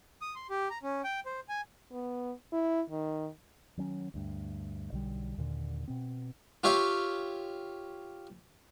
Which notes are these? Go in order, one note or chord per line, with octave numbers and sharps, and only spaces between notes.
D#6
C6
G4
A#5
C#4
G5
C5
G#5
B3
E4
D#3
D#3 F#3 C#4
D2 G2
B1 D3 D#3 G3
D#2 A#2 D3
B2 C4
F4 G4 C#5 E5 F5